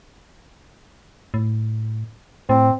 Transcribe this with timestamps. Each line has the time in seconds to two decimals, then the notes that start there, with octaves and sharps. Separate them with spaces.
1.34 A2
2.49 A2 C4